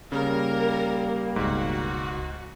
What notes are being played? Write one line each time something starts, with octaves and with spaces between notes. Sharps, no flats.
C#3 G3 A#3 A#4
E1 C#2 G#2 F#4